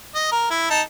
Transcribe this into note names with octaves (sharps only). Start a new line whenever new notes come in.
D#5
A#4
E4
D#4 A5